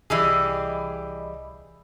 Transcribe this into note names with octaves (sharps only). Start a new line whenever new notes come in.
C2 E3 G3 G#4 D#5 B5